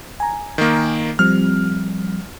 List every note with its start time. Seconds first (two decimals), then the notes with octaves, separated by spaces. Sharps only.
0.20 G#5 A#5
0.58 D#3 A#3
1.19 F3 G3 C4 F6